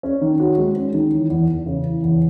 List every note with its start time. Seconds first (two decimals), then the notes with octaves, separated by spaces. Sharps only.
0.03 C#4
0.21 D#3
0.40 F#4
0.58 G#3
0.76 C#4
0.94 D#3
1.12 E3
1.30 E2
1.48 E2
1.66 C#3
1.84 E3
2.02 E2